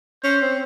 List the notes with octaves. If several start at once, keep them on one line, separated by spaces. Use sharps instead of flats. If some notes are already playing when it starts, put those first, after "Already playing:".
C#4 C5
C4